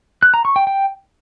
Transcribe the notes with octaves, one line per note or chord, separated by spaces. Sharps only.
F#6
A#5
C#6
G5
G5